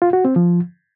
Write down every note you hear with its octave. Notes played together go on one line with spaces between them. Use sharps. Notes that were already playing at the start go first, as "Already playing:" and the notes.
F4
F#4
C4
F3